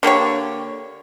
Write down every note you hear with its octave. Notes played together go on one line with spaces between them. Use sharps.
D3 A#3 G4 C#5